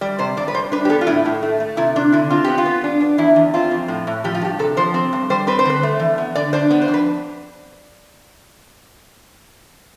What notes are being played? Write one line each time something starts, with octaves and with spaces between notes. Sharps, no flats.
G3 D5
C3 C5
G2 D5
B4
G2 C5
D4 B4
G4
B3 A4
F4
A2 E4
A2
A3
A3
C3 E4
C3 D4
D3 E4
C4 F4
B3 G4
F4
B3
D4
D4
E2 E4
E2
C4 F4
F2
A2
A2
F3 G4
F4
G2 G4
C3 A4
F3 C5
C4
G2
G3 C5
C4 B4
C5
D3 B4
A3
E3
B3
D3 D5
D4 C5
B3 B4
C5
F2
B4